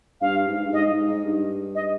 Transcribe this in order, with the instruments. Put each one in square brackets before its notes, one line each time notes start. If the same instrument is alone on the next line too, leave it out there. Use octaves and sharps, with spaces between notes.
[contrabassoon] G2 [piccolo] F5
[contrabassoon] G#2
G2
[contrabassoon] G#2 [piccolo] D#5
[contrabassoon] G#2
G#2
G2
[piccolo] D#5